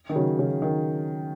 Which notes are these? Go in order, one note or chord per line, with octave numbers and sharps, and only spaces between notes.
D#3
C#3 F#3
C#3 F#3
D#3